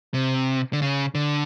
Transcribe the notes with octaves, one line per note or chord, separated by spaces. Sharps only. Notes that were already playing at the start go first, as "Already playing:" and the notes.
C3
D3
C#3
D3